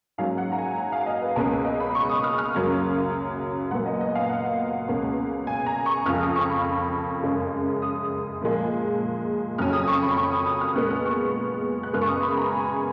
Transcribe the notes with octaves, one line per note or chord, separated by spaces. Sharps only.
G#2 F#3 A#3 C#4 F5
F#5
A#5
G#5
A#5
F5
D#5
B4
C#2 B2 A#3 C#4 A#4
D#5
B5
C#6
D#6
F6
F6
F#2 C#3 F#3 A#3 C#4
A#2 F#3 B3 F#5
D#5
D#5
F5
F#5
C#2 B2 A#3 C#4
G#5
A#5
C#6
F2 C#3 F3 F6
D#6
C#6
B5
F#2 C#3 G#3 C#4
D#6
A#2 F3 G#3
F2 C#3 F#3 C#4 F6
D#6
C#6
B5
C#6
D#6
D#6
F6
A#2 G#3 B3 F#6
F6
C#6
F#6
F#2 C#3 G#3 B3 F6
C#6
D#6
B5
A#5
G#5